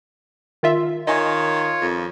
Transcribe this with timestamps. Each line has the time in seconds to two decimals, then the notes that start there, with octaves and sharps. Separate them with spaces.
0.63 D#3 F4 E5
1.07 D#3 F4 C#5 D#5 G#5
1.81 F2